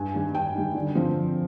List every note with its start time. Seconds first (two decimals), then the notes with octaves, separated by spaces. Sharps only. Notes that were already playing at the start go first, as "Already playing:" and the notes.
Already playing: G2 G#5
0.14 D#3 G3
0.34 G2 G5
0.55 D#3 G3
0.75 D3
0.95 F3 C4